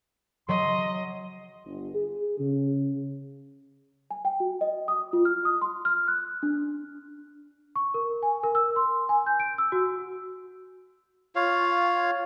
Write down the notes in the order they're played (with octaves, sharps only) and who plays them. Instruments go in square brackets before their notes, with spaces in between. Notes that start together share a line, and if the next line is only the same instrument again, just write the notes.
[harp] F#3 [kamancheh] D#5 [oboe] C6
[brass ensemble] G1
G#4
C#3
[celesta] G#5
G5
F#4
D#5
D#6
F4
F6
D#6
C6
F6
F#6
D4
C#6
A#4
G#5
A#4
E6
C6
G#5
G6
D7
E6
F#4
[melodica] F4 C#5 F5